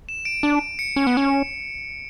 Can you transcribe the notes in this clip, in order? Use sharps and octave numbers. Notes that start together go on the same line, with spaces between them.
E7
D7
D4
C#7
C#4
B3
C#4